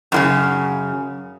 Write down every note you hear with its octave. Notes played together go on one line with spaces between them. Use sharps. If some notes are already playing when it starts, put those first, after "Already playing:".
F#2 A2 C#3